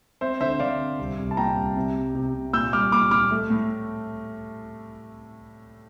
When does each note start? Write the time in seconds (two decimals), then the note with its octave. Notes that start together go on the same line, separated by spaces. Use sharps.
0.21 C4 C5 E5
0.41 D3 C5 E5
0.59 D3 D5 F5
0.80 C4
0.99 C2
1.18 C2
1.31 A5
1.37 A#2 G5 A#5
1.57 C2
1.77 C3
1.96 G3
2.15 C3
2.34 C3
2.53 A#2 E6 G6
2.73 G3 D6 F6
2.92 A#2 D6 F6
3.11 A#2 D6 F6
3.31 A3
3.50 A2